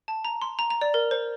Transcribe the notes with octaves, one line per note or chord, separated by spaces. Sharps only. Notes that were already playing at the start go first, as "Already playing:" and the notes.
A5
A#5
C6
A#5
A#5
D5
A#4
C5